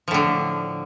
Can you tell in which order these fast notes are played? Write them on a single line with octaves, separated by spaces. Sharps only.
F3 A2 D3